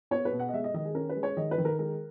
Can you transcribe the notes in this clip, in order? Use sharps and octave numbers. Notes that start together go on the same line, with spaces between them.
B3 C#5
B4
B2
F#5
D#5
G#3 E5
D#5
D#3 D#5
G#4
C#4 A#4
B4
G#3
C#5
D#3 D#5
B4
D#3
A#4
G#3 A#4